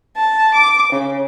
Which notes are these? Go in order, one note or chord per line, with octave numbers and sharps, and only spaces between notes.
A5
D6
C#3